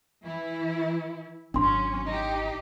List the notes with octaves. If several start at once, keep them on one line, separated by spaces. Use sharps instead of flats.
E3 E4
G#1 F#3 C#4 D4 C6
D#4 G4